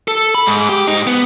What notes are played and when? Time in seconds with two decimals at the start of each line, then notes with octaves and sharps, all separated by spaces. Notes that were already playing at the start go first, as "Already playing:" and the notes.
0.08 A4
0.34 B5
0.47 G#2
0.69 G4
0.88 G#2 D#4
1.07 B3